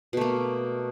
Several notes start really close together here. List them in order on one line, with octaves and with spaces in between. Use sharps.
B2 A3 A#3